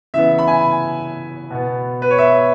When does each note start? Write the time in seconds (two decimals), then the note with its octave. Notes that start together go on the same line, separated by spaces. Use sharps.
0.14 C#3 E3 B3 E5
0.39 B5
0.48 G#5
1.51 B2 B3
2.02 B4
2.11 C#5
2.18 E5